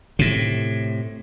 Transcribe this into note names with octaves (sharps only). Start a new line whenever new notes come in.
A2 C3